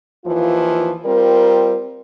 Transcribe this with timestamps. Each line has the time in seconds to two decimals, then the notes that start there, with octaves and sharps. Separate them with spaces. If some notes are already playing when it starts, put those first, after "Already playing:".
0.25 D#2 E3 F3 F4
1.06 G3 C4 F4 A#4